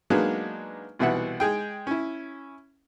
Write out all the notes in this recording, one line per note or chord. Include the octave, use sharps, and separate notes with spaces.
F#3 G#3 A#3 B3 D4 D#4
C2 B2 E3 E5 F#5
G#3 G#4 G5
C#4 E4